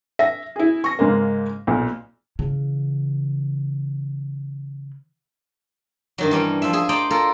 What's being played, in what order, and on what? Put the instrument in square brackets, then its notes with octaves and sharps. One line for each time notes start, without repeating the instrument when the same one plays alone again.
[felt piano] E5 A#6
E4 G#4
C#6 A#6
G#2 C#3 G#3 A#3
B1 A#2
[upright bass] C#3 E3
[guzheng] G2 D#3 F#3
E3 G3 C#4
F3 E5
G#4 E5
C5 D5 D#5 G5 A#5
F4 A4 A#4